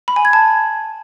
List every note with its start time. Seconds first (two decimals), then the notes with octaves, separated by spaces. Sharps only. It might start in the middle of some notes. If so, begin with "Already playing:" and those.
0.08 B5
0.16 G#5
0.25 G#6
0.33 A5